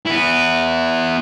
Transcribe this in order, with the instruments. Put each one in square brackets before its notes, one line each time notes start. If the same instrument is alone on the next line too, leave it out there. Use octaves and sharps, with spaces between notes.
[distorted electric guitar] B3 E4